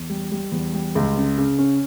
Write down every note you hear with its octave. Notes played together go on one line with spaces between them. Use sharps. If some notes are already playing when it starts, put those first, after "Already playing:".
Already playing: E2
G3
G3
E2
G3
C#2
C#3
C#3
C#4